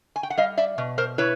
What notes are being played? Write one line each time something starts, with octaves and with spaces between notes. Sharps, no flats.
G#5
G5
F#5
G3 D#5 F5
D5 E5
B2
A#4 C5
E4 B4 C#5